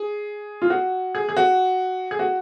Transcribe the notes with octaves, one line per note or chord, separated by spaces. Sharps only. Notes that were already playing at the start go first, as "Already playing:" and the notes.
Already playing: G#4
F4
F#4
G#4
G#4
F#4
G#4
F#4